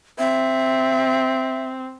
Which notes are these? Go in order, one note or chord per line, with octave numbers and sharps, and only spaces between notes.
C4 E5